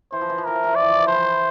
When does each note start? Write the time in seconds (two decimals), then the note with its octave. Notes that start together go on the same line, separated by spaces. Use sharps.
0.12 E3 C5
0.21 F3
0.30 E3
0.38 F3
0.45 E3 A#4
0.55 F3
0.64 E3
0.73 F3 D5
0.81 E3
0.90 F3
0.98 E3
1.07 F3 C5
1.15 E3